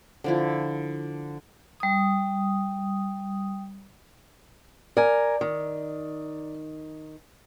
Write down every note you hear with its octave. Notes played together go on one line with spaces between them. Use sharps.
D3 F3 E4
G3 D#6
A#4 D5 G#5
D#3